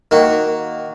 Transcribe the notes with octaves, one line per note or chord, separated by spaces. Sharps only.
D#3 A#3 F#4